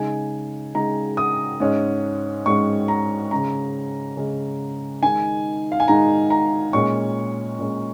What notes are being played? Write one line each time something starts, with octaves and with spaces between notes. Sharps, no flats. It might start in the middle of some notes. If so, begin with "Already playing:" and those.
Already playing: C#3 G#3 D#4 G#5
C#3 G#3 D#4 A#5
D#6
G#2 G#3 C#4
G#2 G#3 C#4 C#6
A#5
C#3 G#3 C#4 A#5
C#3 G#3 C#4
D#3 G#3 D#4 G#5
F5
G#5
D#3 G#3 D#4 A#5
A#5
A#2 G#3 C#4 C#6
A#2 G#3 C#4